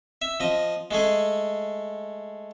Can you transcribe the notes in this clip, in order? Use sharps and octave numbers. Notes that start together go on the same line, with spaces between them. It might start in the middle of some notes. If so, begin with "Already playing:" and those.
E5
F3 D#5
G#3 A3 G#4